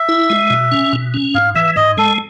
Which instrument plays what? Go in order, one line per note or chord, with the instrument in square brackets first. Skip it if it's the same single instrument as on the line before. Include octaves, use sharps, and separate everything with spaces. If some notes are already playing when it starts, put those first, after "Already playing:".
Already playing: [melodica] E5
[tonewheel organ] E4
G#3
B2
C#4
B2
C#4
[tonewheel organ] G#2 [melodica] F5
[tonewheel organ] E3 [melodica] E5
[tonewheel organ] G#2 [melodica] D#5
[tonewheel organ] G#3 [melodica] A4